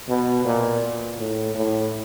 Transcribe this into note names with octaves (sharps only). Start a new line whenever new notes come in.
B2
A#2
A2
A2